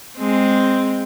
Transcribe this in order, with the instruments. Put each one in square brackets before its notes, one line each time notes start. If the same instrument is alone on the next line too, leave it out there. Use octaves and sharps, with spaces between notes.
[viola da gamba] G#3 C4